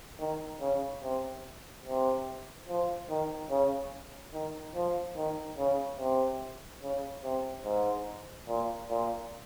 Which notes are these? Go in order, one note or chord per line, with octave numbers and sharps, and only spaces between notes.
D#3
C#3
C3
C3
F3
D#3
C#3
D#3
F3
D#3
C#3
C3
C#3
C3
G#2
A#2
A#2